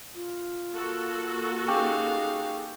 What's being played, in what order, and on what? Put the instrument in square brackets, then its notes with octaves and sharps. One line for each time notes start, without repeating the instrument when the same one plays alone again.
[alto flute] F4
[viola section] A#3 F#4 A4
[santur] C#4 G4 [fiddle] D#4 F5 [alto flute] G#4